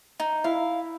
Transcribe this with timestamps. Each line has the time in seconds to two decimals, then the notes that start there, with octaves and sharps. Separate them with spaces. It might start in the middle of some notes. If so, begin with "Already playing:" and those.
0.20 D#4
0.44 E4 F5